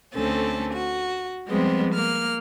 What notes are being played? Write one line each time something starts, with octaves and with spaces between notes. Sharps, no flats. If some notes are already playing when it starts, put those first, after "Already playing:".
D2 A3 C4 C#4 A4
F#4
F3 G3 G#3 B3 C4
A#3 F6